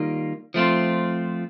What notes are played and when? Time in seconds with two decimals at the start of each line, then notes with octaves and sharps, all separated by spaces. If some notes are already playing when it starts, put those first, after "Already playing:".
Already playing: D#3 G3 A#3 F4
0.54 F3 A3 C4 F4